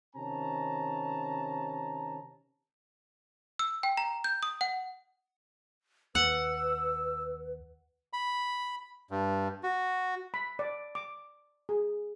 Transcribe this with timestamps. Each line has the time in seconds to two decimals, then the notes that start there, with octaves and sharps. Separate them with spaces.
0.15 C3 D#3 C#4 A5 A#5
3.59 E6
3.83 G5
3.97 A#5
4.24 G6
4.43 D#6
4.61 F#5
6.15 D#2 B4 F#5 E6
8.13 B5
9.11 G2
9.63 F#4
10.34 B5
10.59 D5
10.95 D6
11.69 G#4